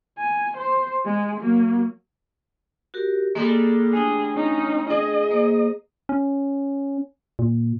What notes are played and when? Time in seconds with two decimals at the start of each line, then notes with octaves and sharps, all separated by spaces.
0.18 G#5
0.57 C5
1.05 G#3
1.40 F#3 A#3
2.94 F#4 G4 A#4
3.35 G3 G#3 A#3 A4
3.93 A3 D4 G#4 G5
4.35 C#4 D#4
4.90 G#4 D#5
5.31 A#3 C5
6.09 C#4
7.39 A#2